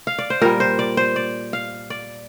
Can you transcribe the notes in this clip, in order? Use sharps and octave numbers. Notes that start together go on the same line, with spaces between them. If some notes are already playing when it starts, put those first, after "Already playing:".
F5
D5
C5
A#2 G3 A#4
C5
D5
C5
D5
F5
D5